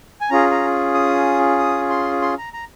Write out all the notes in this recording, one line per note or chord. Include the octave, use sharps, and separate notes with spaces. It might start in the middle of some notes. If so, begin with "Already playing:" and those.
G#5
C#4 F4 G#4 A#5
A#5
D#6
D#6
C6
C6
A#5
A#5